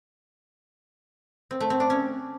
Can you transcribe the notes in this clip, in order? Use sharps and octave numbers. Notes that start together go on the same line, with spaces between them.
C4
A3
C4
D4
C#4